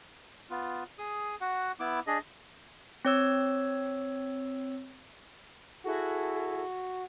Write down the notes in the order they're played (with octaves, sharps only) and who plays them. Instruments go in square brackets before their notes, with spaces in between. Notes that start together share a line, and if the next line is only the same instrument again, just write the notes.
[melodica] B3 F4
G#4 D#6
F#4 F#5
B3 E4 D6
D4 G#4 D#5
[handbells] C4 C#5 E6
[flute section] E4 G#4 A4 [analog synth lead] F#4